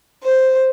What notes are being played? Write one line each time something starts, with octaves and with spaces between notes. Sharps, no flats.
C5